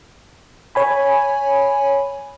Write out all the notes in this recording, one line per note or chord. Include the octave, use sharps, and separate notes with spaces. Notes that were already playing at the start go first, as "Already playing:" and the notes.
C#5 G#5 B5